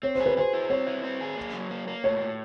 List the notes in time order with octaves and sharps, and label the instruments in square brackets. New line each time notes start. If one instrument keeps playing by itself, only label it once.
[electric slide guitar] C4 [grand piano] C#5
[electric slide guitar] G#4 [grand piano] C5
[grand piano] B4
[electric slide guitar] G#4 [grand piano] C5
[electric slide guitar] E4
[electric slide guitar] C4 [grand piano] C#5
[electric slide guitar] E4
C4
G#4
A#3
F#3
A#3
A#3
[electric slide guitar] A2 [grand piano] C#5
[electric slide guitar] A2